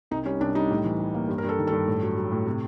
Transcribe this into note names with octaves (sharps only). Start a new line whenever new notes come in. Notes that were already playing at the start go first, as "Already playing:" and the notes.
C2 D#4
G3 C#4
C2 D4
G3 D#4
A2
E3
G3
A#3
G2
A#4
G2 A4
D#3
G2 A4
A2
F#3
F#3
A2
C3